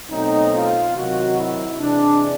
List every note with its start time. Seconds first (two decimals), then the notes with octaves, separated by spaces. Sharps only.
0.10 B2 F#3 A3 C4 D#4
0.53 F4
0.95 C3 D#3 F#3 F#4
1.37 E4
1.79 C3 E3 G#3 D4